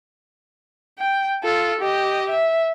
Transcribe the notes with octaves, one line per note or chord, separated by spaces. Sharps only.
G5
F4 A4
G4 D#5
E5